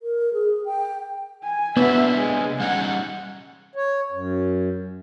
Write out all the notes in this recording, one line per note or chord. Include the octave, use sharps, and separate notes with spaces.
A#4
G#4
G5
G#5
C3 A#3 B3 D4 E5
G#3
G3 C#4 D#4 F#5
C#5
F#2